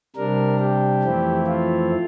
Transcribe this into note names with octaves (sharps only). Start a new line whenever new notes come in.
C3 G3 D4 A#4
G4
F2 E3 A3 C4 E4
F4